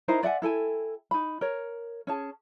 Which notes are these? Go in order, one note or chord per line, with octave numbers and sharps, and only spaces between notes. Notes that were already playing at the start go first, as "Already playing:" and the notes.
D#4 E4 A#4 C5
D5 E5 F#5 G#5
E4 A4 G5 G#5
D#4 B5
A#4 C#5
C#4 G#4 A5